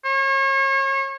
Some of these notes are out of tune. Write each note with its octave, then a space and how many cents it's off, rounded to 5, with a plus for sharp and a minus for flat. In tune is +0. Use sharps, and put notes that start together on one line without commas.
C#5 -35